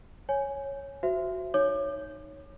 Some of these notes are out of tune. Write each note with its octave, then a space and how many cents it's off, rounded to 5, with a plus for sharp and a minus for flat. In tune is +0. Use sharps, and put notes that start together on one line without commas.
C#5 -5 G#5 +0
F#4 +0 C5 -20 E5 +20
D#4 +0 C#5 +0 D6 +35